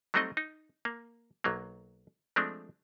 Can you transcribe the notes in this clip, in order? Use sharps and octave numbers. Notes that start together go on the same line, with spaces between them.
F#3 G3 A3 C4 D#4 D#5
D#4
A#3
B1 F#3 A#3
F3 G#3 A3 C4 D4